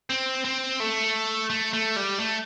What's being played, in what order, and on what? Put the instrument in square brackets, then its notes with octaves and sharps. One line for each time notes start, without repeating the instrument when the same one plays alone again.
[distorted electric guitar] C4
C4
A3
A3
A3
G3
A3